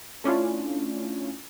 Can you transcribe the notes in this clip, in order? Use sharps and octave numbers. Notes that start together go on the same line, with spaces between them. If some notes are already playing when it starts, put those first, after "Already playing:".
A3 C#4 D4 E4 F4